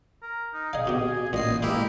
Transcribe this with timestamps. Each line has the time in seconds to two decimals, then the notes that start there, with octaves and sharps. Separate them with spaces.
0.22 A#4
0.53 D#4
0.73 G#4 D#5 F5
0.87 B2 G4
1.33 A1 A#2 D#5 C7
1.62 E3 G#3 A#3 E4 G4